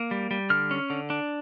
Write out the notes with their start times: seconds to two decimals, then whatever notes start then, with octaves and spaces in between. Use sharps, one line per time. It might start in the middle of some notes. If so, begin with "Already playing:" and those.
Already playing: A#3
0.11 G3
0.31 G3
0.50 D3 F6
0.71 C#4
0.90 D3
1.10 D4